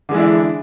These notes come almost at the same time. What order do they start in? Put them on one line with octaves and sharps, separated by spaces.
D3 G#3 E3 D4 E4